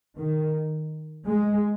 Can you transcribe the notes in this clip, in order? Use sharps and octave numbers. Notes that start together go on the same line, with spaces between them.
D#3
G#3